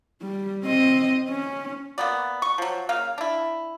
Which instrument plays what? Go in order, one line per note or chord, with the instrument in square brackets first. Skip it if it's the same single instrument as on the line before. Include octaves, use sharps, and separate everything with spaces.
[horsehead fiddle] G3
C4 D#5
C#4
[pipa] A#3 B3 D5
C#6
F3 F#3
C#3 A#3 F5
D4 E4